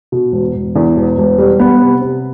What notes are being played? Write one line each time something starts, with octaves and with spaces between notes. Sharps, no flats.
B2
E1
E1
E2
E1
E1
G3
B3
C3
C3